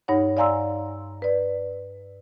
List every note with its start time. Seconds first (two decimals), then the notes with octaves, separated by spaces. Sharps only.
0.08 G2 D#4 C#5 F#5
0.37 D5 F5 G#5 A#5 C6 E6
1.22 B4 D5